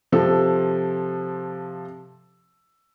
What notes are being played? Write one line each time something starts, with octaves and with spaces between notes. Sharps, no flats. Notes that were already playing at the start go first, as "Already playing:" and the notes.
C3 F3 A4